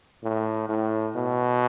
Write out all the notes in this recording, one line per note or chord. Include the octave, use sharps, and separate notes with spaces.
A2
A2
B2